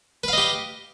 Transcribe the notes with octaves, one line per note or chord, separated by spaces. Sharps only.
G4 B4 D#5 F5